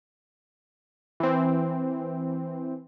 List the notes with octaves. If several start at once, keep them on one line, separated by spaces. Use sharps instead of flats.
E3 C4